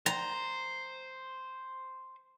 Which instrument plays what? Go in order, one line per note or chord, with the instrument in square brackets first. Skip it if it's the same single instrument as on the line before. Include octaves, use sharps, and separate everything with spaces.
[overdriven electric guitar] C5 [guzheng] A#5